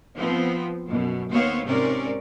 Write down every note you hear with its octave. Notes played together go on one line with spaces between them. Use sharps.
F3 B3 C4
F#2 B2
D#2 B3 C4 C5 C#5 F5
G#2 C3 C4 C#4 A#4 D5